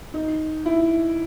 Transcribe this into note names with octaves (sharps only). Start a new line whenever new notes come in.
D#4
E4